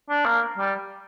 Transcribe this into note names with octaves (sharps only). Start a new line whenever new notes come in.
D4
A#3
G3